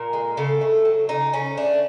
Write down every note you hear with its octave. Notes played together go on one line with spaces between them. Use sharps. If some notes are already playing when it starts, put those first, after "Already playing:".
Already playing: A#2 A#4
G#3
C#3 A4
A3
F#3
C#3 D#4
C#3 C#4
A3 D4